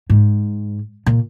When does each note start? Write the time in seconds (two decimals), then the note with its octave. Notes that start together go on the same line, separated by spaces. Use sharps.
0.10 G#2
1.06 A#2